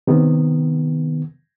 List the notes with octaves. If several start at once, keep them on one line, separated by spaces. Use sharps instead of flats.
C3 D#3 B3